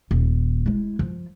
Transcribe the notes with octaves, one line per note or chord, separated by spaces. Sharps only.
D#1
G#3 E4
F3